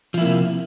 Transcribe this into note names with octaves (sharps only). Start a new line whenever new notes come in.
C3 F3 A#3 E4